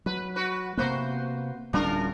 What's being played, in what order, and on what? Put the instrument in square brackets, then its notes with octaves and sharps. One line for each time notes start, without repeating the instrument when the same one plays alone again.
[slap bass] F#3 [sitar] B4
[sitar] F#4 B4
[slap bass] C3 A#3 B3 [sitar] F#4 B4 C5
[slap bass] D1 G3 C#4 [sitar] D4 F4 A#4